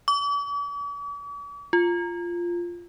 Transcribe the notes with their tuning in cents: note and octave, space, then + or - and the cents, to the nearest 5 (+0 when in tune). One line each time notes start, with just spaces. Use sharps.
D6 -45
F4 -5